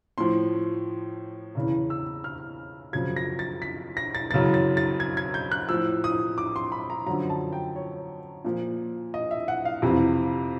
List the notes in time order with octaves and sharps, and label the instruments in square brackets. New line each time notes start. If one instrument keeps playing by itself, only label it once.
[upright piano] A2 F3 C6
E2 C#3 E3
E6
F6
F#2 C#3 F3 G#6
A#6
A6
B6
A#6
A6
F#2 C#3 E3 A6
A6
A6
G#6
G#6
G6
F#6
A2 F3 E6
D#6
D6
C6
B5
A#5
F#2 D3 F3 A#5
A5
G5
C#5
A#2 F3
D#5
E5
F#5
F5
F2 C3 E3